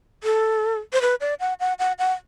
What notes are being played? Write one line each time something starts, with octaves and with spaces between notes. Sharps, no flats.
A4
C5
B4
D5
F#5
F#5
F#5
F#5